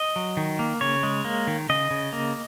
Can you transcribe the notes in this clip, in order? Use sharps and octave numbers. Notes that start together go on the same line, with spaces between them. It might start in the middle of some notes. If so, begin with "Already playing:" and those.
Already playing: D#5
F#3
D#3
A#3
C#3 C#5
G#3
A#3
D#3
C#3 D#5
C#3
A#3